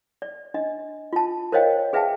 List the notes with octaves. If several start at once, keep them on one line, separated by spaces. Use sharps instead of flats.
D5
D4 D#5
F4 A5
A#4 C5 C#5 D#5 F5 G5
G#4 B4 E5 F5 G5 A5